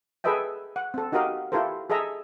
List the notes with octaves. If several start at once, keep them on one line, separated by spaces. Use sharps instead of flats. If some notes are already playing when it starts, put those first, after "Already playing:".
G#4 A4 B4 D#5 E5 G5
F#5
C4 A4
D#4 F#4 G4 A#4 D#5 F5
E4 F4 G4 A4 A#4 C5
G#4 A4 D#5 E5 A#5